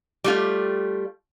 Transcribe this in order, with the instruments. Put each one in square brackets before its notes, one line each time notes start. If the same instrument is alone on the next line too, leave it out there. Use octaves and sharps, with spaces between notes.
[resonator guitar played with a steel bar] G3 A3 F4